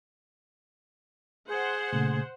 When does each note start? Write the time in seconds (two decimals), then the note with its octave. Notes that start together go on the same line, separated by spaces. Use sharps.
1.48 G#4 C5 F#5
1.93 A#2 C#3 A3